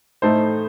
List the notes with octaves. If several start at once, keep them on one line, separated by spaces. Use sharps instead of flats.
A2 A3 D#4 A4 C5